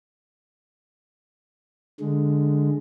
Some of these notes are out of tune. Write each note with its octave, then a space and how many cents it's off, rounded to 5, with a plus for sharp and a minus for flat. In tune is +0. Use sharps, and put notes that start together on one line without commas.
D3 +0 G#3 +0